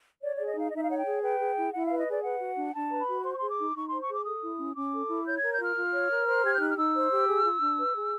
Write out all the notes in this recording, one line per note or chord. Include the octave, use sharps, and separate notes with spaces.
C#5 D5
G#4 D5
D#5
D#4 F5
D#5
D#4 E5
F5
C#5 F#5
G5
G#4
B4 G5
G#4
E4
E4 F#5
B4 F5
D#5
G#4 D5
B4 F#5
F#4
D4
D4 A5
B4 A#5
B5
F#4
C5 C6
C#6
G#4 C6
D6
D#4
D#4 C#6
C5 C6
C#6
G#4 D6
A4 D#6
E4
C#4
C#4 D6
A4
E4
C#5 G6
A#4 G#6
G6
F4 F6
F4
C#5
A#4
C5
G4 G#6
G6
D#4 F#6
F6
D#4 E6
C5
G4
G#4
F4
D4
B4
G#4